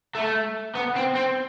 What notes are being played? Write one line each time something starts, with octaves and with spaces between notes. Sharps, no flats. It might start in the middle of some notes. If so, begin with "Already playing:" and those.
A3
B3
C4
C4